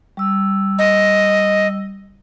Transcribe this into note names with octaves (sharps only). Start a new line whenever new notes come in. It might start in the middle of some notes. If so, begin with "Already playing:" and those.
G3 E6
D#5